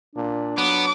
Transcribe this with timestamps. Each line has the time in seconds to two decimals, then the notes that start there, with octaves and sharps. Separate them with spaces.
0.16 A#2 D4
0.58 F#3 B3 D6